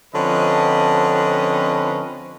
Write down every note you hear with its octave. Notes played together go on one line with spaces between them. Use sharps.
D3 F3 C4 C#4 B4 D#5